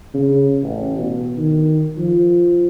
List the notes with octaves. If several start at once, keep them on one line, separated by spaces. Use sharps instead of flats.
C#3
A1
B2
D#3
F3